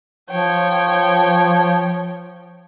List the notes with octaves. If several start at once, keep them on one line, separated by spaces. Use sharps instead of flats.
F3 C#5 G5